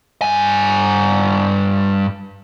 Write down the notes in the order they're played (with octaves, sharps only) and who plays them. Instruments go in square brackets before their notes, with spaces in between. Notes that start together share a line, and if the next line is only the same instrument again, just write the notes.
[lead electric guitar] G2 G#5